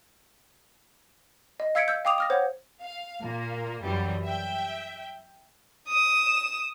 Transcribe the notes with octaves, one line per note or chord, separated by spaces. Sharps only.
D#5
F5 E6 G#6 B6 C#7 D7
E6 G6
F5 G5 D6 D#6 F7
D#6 F6 A#6
C5 C#5 F#5
F5
A#2 A#3
F#2 E3 F#3 G3
E5 G5
D#6 E7